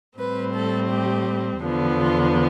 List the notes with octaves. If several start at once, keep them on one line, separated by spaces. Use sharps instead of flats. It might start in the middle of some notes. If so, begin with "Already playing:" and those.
A2 G3 C4 B4
A4
G4
E2 D3 F3 B3
F4